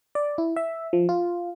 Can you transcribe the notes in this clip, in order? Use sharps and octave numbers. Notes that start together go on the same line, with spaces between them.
D5
E4
E5
F3
F4